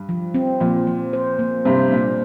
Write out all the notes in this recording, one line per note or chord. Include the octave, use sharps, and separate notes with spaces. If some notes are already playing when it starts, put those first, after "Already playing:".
Already playing: G2
F3
C4
A#2 F3
F3
C5
A#3
G2 C3 C5
A#2 D4